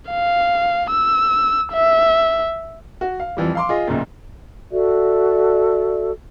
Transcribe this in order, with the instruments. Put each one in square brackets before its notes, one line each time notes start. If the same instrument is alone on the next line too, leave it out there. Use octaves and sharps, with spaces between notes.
[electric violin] F5
E6
E5
[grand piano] F#4
F5
F2 E3 F3 G3
F5 C6 D6
F4 G#4 D#5
F#1 B1 F#2 A#2
[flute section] F#4 A4 D5 E5